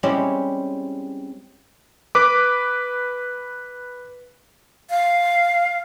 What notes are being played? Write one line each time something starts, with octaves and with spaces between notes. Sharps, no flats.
G3 G#3 C4 C#4 E4 G4
B4 D6
F5